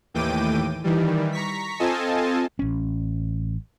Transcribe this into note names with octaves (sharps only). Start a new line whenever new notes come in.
D#2 A2 E3 G5 D6 D#7
D#3 E3 G3
A#5 C#6 B6
C4 F4 A4 D#5 G#5 A5
A1 C#4